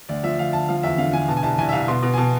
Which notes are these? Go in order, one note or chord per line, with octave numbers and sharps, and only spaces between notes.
D2 D5
F3 E5
D2 F5
D2 A5
F3 F5
E2 E5
D3 F5
D3 G#5
B2 A5
G#5
C2 A5
C2 G#5
E5
C2 F5
B2 C6
B2
G#5
B2 A5